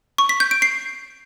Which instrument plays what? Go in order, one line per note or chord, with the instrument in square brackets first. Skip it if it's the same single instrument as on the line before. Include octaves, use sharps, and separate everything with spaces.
[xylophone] C#6
B6
G6
D7
C7